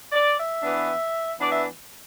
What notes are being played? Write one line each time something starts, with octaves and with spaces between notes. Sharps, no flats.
D5
E5
E3 B3 D4
E3 B3 D4 D5
E5